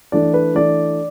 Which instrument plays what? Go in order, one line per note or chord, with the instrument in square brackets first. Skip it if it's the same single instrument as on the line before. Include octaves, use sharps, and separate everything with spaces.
[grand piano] E3 A3 D4 D5
B4
E3 A3 D4 D5